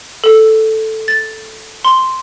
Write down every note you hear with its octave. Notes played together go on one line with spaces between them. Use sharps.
A4
A6
C6